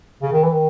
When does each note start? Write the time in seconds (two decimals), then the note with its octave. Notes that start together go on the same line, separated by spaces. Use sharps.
0.22 C#3
0.32 D#3
0.43 E3
0.52 D#3